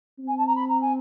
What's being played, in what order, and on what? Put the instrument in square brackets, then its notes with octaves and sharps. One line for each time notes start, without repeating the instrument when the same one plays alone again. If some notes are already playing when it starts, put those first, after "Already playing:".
[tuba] C4
[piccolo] G#5
A5
A#5
B5
A#5
G#5